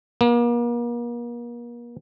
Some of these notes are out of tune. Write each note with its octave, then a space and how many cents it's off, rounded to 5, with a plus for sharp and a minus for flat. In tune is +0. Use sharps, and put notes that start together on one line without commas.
A#3 +40